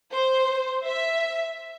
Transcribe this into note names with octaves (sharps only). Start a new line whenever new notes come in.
C5
E5